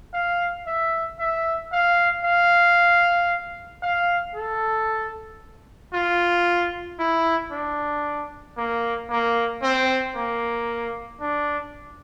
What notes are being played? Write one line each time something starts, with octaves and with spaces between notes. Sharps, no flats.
F5
E5
E5
F5
F5
F5
A4
F4
E4
D4
A#3
A#3
C4
A#3
D4